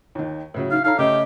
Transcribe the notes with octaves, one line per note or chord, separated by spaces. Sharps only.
D#2 D#3
A2 C#3 F#3
D#4 F5
D#4 A4 C#5 F5 A#5
C#3 A3 C#4 G4 D#5